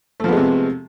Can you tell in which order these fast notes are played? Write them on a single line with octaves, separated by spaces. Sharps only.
A3 F3 B3 G#3 C3